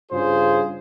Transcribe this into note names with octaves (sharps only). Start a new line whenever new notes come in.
G2 C#3 F4 G#4 C5